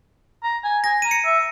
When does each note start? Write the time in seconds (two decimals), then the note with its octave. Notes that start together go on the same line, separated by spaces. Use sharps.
0.44 A#5
0.64 G#5
0.84 G#5 A#6
1.02 A#5 D#7
1.11 C#7
1.25 E5